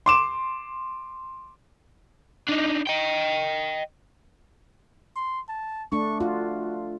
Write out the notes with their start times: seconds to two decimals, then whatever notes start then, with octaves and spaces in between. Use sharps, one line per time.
0.06 C6 D6 E7
2.49 D4 D#4
2.87 D#5 G5
5.16 C6
5.49 A5
5.92 A3 D4 C#6
6.20 F4 F#4